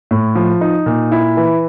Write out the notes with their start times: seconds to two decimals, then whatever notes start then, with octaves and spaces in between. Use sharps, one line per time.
0.11 A2
0.35 F3
0.61 D#4
0.86 A#2
1.12 E4
1.37 E3